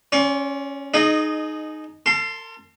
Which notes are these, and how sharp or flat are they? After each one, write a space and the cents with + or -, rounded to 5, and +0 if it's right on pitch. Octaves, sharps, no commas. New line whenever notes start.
C#4 -5 D5 -45 C6 +45
D#4 -10 G#4 +30 D#5 -20
A#4 -45 A5 +0 C6 +0